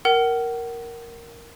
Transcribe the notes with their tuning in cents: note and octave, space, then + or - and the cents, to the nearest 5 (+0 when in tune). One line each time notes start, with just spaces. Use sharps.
A#4 +0 F#5 +35